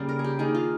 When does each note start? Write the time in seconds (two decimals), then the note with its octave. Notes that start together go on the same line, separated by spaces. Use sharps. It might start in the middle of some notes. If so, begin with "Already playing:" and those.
Already playing: C#3 G3 A#3
0.09 A#4
0.19 G#4
0.24 G4
0.39 D#3 A#3 G#4
0.55 F4